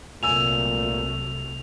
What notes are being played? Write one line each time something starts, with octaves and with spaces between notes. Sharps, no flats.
C2 A#2 F#3 A3 G#5 E6 F7